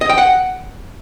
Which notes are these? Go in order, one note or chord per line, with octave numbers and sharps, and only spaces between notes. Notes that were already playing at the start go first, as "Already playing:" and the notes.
D#5
G5
F#5